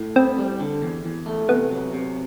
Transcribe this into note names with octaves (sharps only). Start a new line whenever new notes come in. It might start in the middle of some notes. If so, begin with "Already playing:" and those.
Already playing: A2
B3 C4
G3
D3
E2
E2
A3
C3 B3
F#3
C3